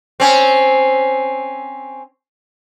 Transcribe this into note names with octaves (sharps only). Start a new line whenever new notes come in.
C4 C#4